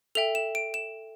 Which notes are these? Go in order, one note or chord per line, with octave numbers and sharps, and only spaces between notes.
A4 E5 G5 F7
E7
D7
E7